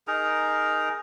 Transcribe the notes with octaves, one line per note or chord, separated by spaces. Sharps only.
D#4 G#4 A#4 A#5